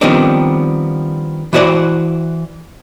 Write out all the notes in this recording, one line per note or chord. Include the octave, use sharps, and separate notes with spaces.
D#3 F3 G3 B3 C4 D4
E3 E4 F#4 C5 D5